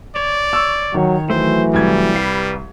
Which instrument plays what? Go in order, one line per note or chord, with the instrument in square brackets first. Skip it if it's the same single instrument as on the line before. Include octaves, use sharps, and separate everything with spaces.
[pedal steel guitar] C#5 [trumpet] D5
[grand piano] C#6 E6
[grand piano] D#3 [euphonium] F#3
[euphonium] E3 [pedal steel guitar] F#3 A3 [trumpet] C5
[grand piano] C2 G#6 [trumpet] G3
[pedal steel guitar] B4 F5 B5